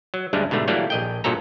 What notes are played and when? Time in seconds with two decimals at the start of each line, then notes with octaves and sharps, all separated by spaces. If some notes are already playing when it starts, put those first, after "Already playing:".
0.14 F#3
0.33 D2 G2 G3 G#3 D4
0.51 G#2 B2 D3 A3
0.68 E3 F#3 G3 A3 A#3 D4
0.90 A#1 D#5 G5
1.24 B1 G2 A#2 F#3 A4 A#5